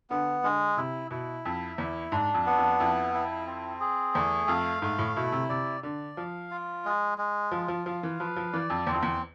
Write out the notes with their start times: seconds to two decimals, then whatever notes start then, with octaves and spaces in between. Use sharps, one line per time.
0.10 D3 B3
0.44 D3 G#3
0.77 C3 E4
1.11 B2 E4
1.45 F2 E5
1.78 E2 E4
2.12 G#2 D4
2.34 F2
2.46 B3
2.58 F2
2.80 F2 E4
3.14 E4
3.47 C4
3.81 G#4
4.15 E2 A3
4.48 F2 F5
4.82 G#2 A3
4.99 A2
5.16 B2 E4
5.32 C3
5.49 C3 D5
5.83 D3 D5
6.17 F3 F5
6.51 F4
6.85 G#3
7.18 G#3
7.51 F3 F4
7.68 F3
7.86 F3 F5
8.03 E3
8.19 F3 B4
8.36 F3
8.53 E3 D5
8.70 F2
8.87 E2 C4
8.94 F2
9.03 E2